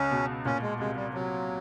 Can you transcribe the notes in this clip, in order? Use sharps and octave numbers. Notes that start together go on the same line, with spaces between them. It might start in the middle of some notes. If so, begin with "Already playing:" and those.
Already playing: C#2 C#4
B2
A#2 C#4
G#3
C2 G#3
G3
C3 F#3